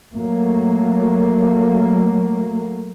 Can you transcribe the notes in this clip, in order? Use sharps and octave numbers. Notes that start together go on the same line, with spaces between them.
F#3 A3 A#3